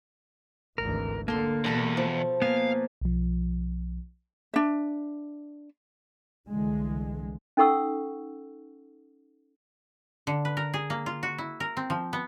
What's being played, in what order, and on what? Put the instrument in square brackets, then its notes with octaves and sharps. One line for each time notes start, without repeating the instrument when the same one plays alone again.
[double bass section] G#1 D2 E3 [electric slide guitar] A#4
[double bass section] D3 [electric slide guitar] A#3 [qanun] A4 C6
[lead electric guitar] E2 [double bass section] B2 [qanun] G3 A4 B5
[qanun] F3
[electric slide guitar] A#3 B3 [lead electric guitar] F5 [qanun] G#5
[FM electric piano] B1 F3
[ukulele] D4 E5
[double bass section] C2 D3 E3 G#3
[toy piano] C#4 D#4 A4 F#5 C#6 E6
[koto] D3
B4
A#4
G#4
A#3
F4
F#4
E4
A#4
C4
F3
B3